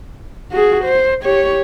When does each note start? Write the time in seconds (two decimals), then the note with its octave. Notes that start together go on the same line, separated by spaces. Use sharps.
0.52 F#4 G#4
0.85 C5
1.23 G4 C#5